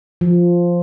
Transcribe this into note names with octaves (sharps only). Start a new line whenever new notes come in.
F3